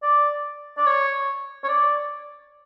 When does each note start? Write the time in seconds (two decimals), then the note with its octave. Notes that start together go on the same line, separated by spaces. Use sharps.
0.03 D5
0.78 D5
0.87 C#5
1.64 C#5
1.69 D5